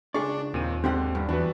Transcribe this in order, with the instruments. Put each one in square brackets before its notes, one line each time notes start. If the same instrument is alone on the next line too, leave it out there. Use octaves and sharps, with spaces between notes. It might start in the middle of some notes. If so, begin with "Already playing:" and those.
[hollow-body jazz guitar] C#2 G#4 D5 [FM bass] D4 [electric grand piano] C#6
[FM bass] D#2 [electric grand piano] A#2 C4 D#7
[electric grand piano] G#2 D3 [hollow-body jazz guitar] C4 G4 F#5
[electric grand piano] G2 [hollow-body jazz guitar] G3
[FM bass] E2 [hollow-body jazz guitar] E3 [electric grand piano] D4 F#4 B4